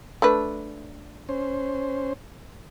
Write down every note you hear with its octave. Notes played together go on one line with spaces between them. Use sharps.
A3 D4 B4
C#4 C5